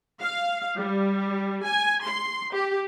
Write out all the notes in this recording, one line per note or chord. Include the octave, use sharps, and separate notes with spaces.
F5
G3
G#5
C6
G4